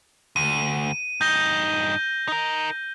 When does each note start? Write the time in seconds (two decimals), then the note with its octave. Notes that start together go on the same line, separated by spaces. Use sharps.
0.36 D2 D#7
1.21 G2 D#4 G6 A#6 G7
2.28 D#4 A#4